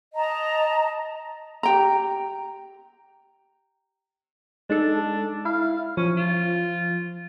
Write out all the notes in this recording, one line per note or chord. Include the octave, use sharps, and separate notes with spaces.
D#5 A5 A#5
G4 G5 A#5
G#3 D4 D#4 A4
E4 F5
F3 C#4
F4